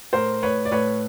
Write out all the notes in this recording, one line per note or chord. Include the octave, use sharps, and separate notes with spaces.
A2 A#4 C5
A2 B4 C#5
D5
A2 B4 C#5